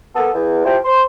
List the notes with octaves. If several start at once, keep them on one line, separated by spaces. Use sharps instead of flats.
A#3 B3 A4
E2
F3 E4 G4 C5
C5 C6